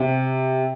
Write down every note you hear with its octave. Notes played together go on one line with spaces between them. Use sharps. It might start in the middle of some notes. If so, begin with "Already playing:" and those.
Already playing: C3